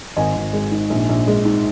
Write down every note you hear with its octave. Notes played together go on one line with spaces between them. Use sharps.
G#1 D#5 G#5
G#1
G#3
G#2
A#1
A#1
G#3
G#2